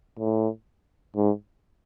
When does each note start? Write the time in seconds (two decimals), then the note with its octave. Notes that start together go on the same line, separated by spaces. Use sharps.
0.19 A2
1.16 G#2